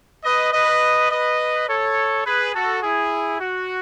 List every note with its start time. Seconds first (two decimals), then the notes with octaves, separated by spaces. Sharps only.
0.25 B4 D#5
0.53 B4 D#5
1.10 B4 D#5
1.68 A4 C#5
2.26 G#4 B4
2.54 F#4 A4
2.83 E4 G#4
3.41 F#4